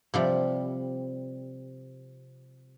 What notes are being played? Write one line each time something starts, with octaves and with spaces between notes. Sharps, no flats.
C3 F3 G3